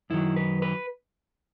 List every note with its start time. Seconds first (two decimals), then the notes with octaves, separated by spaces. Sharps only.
0.10 F#2 D#3 F#3 E4
0.36 B4
0.62 B4